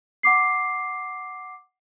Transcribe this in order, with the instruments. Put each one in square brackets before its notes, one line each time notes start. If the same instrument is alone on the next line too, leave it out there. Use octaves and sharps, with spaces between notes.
[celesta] F#5 D6 C7